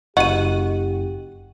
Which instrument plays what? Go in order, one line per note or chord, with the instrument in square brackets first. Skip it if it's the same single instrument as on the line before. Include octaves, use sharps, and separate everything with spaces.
[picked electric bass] F#1 [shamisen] F#4 [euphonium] G4 [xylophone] D#5 D#7